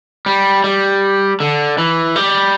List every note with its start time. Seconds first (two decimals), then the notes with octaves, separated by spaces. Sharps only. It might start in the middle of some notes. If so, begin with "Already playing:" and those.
0.26 G3
0.64 G3
1.40 D3
1.78 E3
2.16 G3